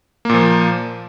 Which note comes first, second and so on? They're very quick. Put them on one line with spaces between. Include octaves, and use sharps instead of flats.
A#3 A#2 F3